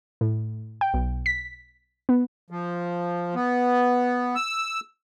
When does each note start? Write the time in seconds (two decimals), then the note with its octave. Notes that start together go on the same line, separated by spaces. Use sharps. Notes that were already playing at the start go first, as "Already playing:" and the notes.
0.21 A2
0.81 G5
0.94 B1
1.26 B6
2.09 B3
2.50 F3
3.35 B3
4.35 E6